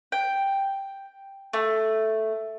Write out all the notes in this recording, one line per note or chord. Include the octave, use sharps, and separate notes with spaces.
G5
A3